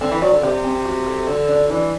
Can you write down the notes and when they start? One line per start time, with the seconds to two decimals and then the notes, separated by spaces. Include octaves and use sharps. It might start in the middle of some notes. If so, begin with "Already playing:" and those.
0.01 D3 C4
0.11 E3
0.22 F#3 D5
0.33 D3
0.43 C3 G4
0.64 C4
0.85 F#4
1.07 A4
1.27 D3 F#4
1.48 D4
1.70 E3 D4